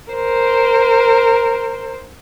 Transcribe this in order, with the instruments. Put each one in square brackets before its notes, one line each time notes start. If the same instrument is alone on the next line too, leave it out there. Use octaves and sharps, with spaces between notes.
[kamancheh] A#4 C5